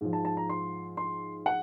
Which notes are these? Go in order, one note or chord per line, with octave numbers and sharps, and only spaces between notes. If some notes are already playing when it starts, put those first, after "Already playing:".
G#2 F3
A5
A5
A#5
C6
C6
F#5